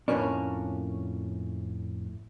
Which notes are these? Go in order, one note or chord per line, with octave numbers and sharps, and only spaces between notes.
F2 A2 C#3 A#3 C#4 D4